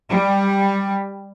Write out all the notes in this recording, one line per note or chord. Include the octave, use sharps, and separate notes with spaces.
G3